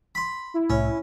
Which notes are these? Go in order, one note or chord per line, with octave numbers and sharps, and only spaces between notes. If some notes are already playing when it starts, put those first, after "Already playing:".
B5 C6
E4
C2 A2 C#4